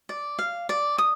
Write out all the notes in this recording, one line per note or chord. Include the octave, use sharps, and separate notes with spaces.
D5
F5
D5
D#6